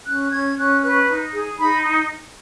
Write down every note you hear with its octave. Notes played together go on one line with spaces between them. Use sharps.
C#4 F#6
C#4 G#6
C#4 F#6
B4 F#6
D#4
G#4
D#4 B5